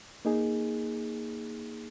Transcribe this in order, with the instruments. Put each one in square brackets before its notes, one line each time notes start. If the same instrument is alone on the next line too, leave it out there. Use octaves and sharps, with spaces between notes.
[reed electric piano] A#3 D#4 G#4